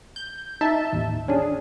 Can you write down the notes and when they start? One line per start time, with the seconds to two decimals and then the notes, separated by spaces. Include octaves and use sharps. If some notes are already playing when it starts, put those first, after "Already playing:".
0.16 G6
0.61 D#4 E5 A5
0.93 A1 D#2
1.28 C#4 D4 G#4